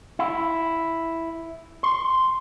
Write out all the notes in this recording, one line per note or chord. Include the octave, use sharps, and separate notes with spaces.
E4
C6